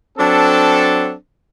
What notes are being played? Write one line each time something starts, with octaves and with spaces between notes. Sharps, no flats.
F#3 C4 D4 A4